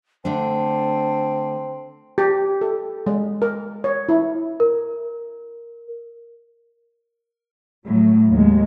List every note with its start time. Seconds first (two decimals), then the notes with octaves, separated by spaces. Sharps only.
0.25 D3 A3 C4 D4 A5
2.18 G4
2.61 A4
3.07 G#3
3.42 A#4
3.84 C#5
4.09 E4
4.60 A#4
7.85 A2 F#3
8.31 D#2 G#3